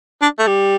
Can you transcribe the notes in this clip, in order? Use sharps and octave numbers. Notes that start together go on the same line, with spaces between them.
D4
A3
G3